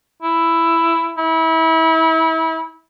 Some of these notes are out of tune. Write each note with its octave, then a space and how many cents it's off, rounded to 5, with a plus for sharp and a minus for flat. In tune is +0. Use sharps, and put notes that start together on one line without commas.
E4 +5
E4 -30